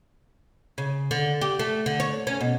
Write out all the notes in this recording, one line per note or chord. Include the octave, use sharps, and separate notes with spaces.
C#3
D3
G4
A3
D3
C#5
C#4
B2